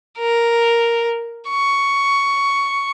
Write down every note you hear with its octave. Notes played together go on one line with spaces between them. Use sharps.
A#4
C#6